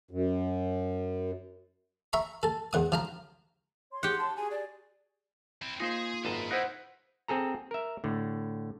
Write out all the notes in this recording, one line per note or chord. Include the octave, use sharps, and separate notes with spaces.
F#2
E5 A#5 B5 C#6
A4 A5
E2 F#5 D#6
F3 F4 A#5
C#5 C6
G4 G#4 F#5
A5
F#4 G#4 G#5
D5
C4 E4
A#3 D#4 F4 G#4 C5
G#1 F#2 B4 D#5 A5
D#4 E4 C5 F#5 F#6
C4 G#4 A4 A#5
A#4 E5
A2 D3